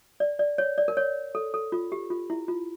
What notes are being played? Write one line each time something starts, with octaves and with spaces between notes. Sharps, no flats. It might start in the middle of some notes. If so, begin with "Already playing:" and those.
D5
D5
C#5
D5
A#4
C#5
A4
A4
F4
G4
F4
E4
F4